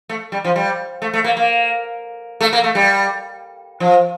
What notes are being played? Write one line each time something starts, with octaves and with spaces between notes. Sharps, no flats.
A3
G3
F3
G3
A3
A3
A#3
A#3
A3
A#3
A3
G3
F3